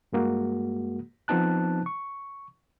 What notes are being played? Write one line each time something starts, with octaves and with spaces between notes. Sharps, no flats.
G2 G#3 A#3 F#4
F3 B3 C4 D#4 A5 F#6
C#6